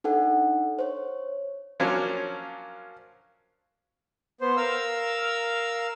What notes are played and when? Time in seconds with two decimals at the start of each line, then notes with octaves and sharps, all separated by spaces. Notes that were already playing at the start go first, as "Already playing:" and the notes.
0.04 D4 D#4 A4 F#5
0.79 C5 C#5
1.80 F3 F#3 A#3 C#4 D4
4.41 B3 C5
4.57 A#4 F5 E6